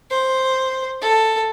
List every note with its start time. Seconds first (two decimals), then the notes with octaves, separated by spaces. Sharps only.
0.10 C5
1.01 A4